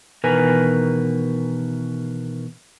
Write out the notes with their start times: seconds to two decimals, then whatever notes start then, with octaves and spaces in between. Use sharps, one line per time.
0.24 B2 D#3 E3 A#4 B4 G#5